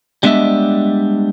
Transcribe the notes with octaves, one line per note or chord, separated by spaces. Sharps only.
G3 G#3 B3 D4 D#5 E5